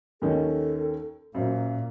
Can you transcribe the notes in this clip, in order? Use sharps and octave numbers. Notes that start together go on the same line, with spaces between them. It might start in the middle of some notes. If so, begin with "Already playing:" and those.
D#2 D#3 C#4 A4
F#2 A#2 C5 F5